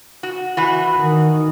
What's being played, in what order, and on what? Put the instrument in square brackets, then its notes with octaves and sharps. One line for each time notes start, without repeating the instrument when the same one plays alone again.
[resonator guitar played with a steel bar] F#4
E3 F#4
[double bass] D#3